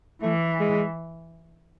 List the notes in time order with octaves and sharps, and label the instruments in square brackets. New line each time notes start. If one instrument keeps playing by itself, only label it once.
[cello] E3 [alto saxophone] A3
[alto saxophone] G#3